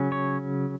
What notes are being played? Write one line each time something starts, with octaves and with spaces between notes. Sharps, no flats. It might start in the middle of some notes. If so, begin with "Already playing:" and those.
Already playing: C#3 F#3 C#4
C#5